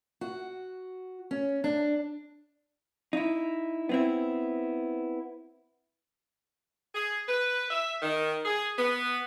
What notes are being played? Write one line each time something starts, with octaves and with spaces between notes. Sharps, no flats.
F#4
C#4
D4
D#4 E4
B3 C4 E4
G#4
B4
E5
D#3
G#4
B3